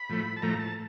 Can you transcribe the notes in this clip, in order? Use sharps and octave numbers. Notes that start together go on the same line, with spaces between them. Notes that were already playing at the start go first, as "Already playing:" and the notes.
Already playing: B5
A2 F3 A3
A5
A2 F3 A3 A#5
A5